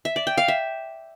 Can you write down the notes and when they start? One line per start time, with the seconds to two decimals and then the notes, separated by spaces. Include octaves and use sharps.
0.05 E5
0.16 D5
0.27 G5
0.38 F5
0.48 E5